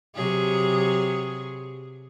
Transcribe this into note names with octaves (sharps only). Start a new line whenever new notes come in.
C3 F#3 G#4